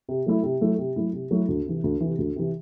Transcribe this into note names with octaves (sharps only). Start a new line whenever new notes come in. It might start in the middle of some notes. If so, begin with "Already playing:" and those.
C3
F#3 A3 E4
C3
F#3 A3 E4
C3
F#3 A3 E4
C3
F#3 A3 E4
D2
C3 E3
D2
C3 E3
D2
C3 E3